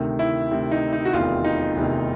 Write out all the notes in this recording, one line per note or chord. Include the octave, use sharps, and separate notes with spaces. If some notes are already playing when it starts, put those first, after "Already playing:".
Already playing: D2 C3 D#3
E4
D2 C3 D#3
D#4
D#4
F#4
F1 E2 C3 D#3 F4
D#4
F1 E2 C3 D#3